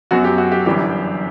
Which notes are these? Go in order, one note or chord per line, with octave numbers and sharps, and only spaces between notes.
F#2 F#3 B3 F#4
G4
F#4
G4
G1 F#2 E3 G3 G4